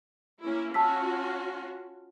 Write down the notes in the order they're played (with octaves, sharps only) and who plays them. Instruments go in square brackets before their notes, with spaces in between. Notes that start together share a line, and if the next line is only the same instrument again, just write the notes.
[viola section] A#3 C#4 E4
[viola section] C#4 F4 F#4 [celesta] A5 E6 B6